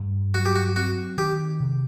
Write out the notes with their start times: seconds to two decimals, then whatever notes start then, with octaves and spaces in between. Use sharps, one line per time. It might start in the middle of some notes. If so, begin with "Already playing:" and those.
Already playing: G2 A3
0.34 F#3 F#4
0.46 G4
0.55 F#4
0.76 C4 F#4
1.17 D#3 G4
1.60 C3